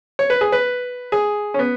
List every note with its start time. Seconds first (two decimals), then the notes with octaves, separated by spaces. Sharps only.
0.19 C#5
0.30 B4
0.41 G#4
0.52 B4
1.12 G#4
1.54 C#4
1.59 B3